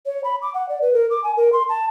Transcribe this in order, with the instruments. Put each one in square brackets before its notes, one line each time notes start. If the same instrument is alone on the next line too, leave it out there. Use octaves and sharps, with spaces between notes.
[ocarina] C#5
B5
D6
F#5
D5
B4
A#4
D6
G#5
A#4
C6
A5